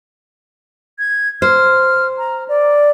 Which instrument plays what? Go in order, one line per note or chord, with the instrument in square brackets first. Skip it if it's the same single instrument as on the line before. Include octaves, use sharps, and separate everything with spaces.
[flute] G#6
[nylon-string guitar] C5 [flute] F6
[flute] A#5
D5